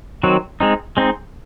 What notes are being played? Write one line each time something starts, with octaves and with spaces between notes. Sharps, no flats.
D#3 F#3 C4 F#4
G#3 C4 D#4
G#3 C4 D#4